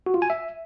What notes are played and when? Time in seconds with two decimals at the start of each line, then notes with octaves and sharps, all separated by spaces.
0.06 F#4
0.14 F4
0.22 G#5
0.30 E5